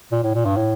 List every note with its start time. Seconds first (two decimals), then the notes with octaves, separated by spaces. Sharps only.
0.12 A#2
0.23 A2
0.35 A#2
0.45 G2
0.56 A2